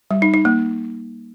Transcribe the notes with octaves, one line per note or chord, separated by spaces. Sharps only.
G3
D#4
D#4
A#3